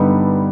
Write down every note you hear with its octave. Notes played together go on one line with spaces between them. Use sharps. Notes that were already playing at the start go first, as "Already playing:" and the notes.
Already playing: G2 D3 G3 B3 D#4